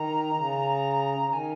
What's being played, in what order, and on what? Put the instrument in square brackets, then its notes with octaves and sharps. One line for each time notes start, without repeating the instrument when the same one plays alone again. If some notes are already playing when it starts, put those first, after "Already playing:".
Already playing: [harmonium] D#3 [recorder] A#5
[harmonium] C#3
C#3
[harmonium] D#3 [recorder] A#5
[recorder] G#5